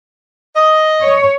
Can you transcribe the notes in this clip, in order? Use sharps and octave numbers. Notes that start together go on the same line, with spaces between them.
D#5
C#5